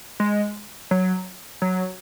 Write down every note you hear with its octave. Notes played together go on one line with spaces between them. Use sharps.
G#3
F#3
F#3